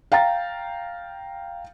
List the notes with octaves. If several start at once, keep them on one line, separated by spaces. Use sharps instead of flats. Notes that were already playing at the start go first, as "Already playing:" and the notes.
F5 G5 A#5 A6